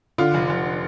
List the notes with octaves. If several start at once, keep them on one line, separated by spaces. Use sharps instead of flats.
D3 F4
F1
F1